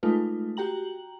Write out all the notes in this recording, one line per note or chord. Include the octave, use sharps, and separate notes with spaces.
G#3 A3 D#4 F4 B4
F#4 G4 G5 A#5 F#7